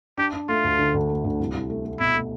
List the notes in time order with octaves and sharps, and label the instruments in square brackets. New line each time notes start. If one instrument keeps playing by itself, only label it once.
[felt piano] D4 [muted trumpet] G4
[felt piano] D4
[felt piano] A3 [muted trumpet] F4
[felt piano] D2
D3
D2
A3
D2
C2
C2
A3
A3
[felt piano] B2 [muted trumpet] E4
[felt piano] A3